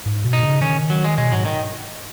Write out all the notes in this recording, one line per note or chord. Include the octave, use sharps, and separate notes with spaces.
G#2
B2
D#4
C#3
D#3 C#4
F#3
G#3
B2 G#3
G#2 F#3
D#3